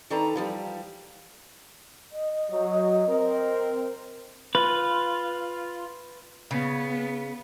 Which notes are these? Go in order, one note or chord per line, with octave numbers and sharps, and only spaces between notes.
D#3 D4 A4 B4 A#5
E3 F3 G3
D#5
F#3
C4 A#4
F4 B4
C#3 B3